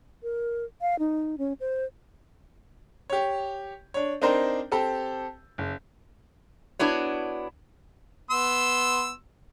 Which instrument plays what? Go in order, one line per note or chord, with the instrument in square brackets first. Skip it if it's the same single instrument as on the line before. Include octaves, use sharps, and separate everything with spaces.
[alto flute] A#4
F5
D#4
C#4
C5
[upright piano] G4 C#5
D4 C#5
C4 D4 D#4 A#4 C5
C4 G4 A4
F#1
[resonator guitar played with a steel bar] B3 D4 E4 F#4 C#5
[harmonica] B3 C6 E6